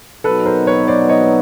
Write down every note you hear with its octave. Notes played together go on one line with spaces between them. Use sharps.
B2 F#3 B3 D#4 A4 B4
A#4 C5
B4 C#5
C5 D5
C#5 D#5